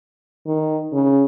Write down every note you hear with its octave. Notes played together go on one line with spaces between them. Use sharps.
D#3
C#3